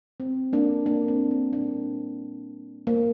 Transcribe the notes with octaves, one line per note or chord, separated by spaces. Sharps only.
C4
A#3 D4
A#3 D4
C4
C4
A#2 G3 A#3 D4
A#3